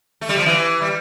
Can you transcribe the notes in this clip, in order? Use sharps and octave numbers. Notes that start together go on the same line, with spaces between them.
A3
G3
F3
E3
G3